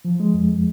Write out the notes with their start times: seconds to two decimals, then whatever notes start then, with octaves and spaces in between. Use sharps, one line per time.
0.05 F3
0.20 G#3
0.34 F2